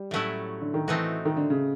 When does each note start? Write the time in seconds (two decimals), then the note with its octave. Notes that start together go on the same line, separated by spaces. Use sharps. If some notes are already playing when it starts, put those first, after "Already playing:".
Already playing: G3
0.11 A2 F#3 A3 C#4 E4
0.61 D3
0.74 D#3
0.88 E3 A3 C4 D#4 F#4
1.25 D#3
1.37 D3
1.50 C#3